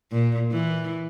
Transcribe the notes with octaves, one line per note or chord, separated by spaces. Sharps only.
A#2
E3